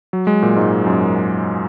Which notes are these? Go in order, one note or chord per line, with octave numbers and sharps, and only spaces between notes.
F#3
G#3
A#2
G#2
F#2